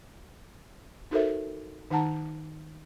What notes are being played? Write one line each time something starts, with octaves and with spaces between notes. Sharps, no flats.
D#4 F#4 A4 A#4 C5 E5
D#3 D#4 F#5 A5 A#5